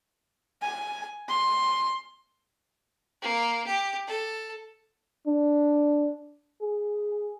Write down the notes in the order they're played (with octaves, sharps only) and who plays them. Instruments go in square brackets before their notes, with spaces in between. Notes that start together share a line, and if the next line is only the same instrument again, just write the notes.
[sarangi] G#5
C6
[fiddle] A#3
G4
A4
[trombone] D4
G#4